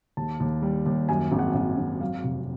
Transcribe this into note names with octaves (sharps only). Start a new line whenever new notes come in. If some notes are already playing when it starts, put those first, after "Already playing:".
D#2 A5
D#2
G3
D#2
F#2 G#5
G#1
F#5
G#1
G#1
F#3 F5
F1